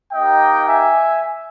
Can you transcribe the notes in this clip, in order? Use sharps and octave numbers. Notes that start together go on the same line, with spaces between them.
A#3 D#4 G4 D#5 G5
E5 G#5